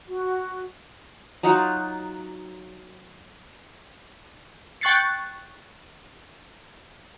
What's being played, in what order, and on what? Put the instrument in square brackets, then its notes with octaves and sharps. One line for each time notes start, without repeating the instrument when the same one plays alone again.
[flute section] F#4
[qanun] F#3 D#4 F4 F#5
[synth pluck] G5 C#6 F#6 A6 C7 C#7